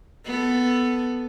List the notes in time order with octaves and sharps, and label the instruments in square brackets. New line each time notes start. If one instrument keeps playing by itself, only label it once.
[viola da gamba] B3 A4